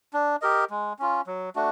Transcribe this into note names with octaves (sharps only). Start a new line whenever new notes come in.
D4
G4 A#4 D#5
G#3
C#4 F4
F#3
A3 D4 F#4